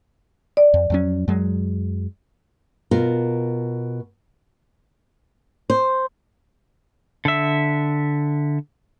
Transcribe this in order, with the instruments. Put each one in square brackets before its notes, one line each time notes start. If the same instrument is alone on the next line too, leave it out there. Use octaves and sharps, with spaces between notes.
[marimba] D5
[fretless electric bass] F2
F2 F#3 C#4
F#2 F#3 G#3
[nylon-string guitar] B2 F4 A#4
C5
[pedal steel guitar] D3 E5